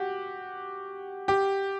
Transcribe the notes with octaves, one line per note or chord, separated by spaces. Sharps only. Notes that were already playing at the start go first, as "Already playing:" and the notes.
Already playing: F#4 G4
G4